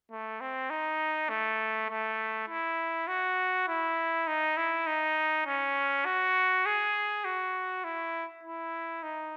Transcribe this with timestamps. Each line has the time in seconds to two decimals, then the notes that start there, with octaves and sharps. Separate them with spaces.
0.11 A3
0.41 C4
0.70 D#4
1.29 A3
1.89 A3
2.48 E4
3.07 F#4
3.68 E4
4.27 D#4
4.57 E4
4.87 D#4
5.46 C#4
6.05 F#4
6.65 G#4
7.25 F#4
7.84 E4
8.43 E4
9.03 D#4